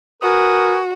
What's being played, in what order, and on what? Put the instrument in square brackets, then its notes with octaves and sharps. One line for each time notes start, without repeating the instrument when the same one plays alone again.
[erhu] F#4 [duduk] A#4 [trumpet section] B4 G#5 D#6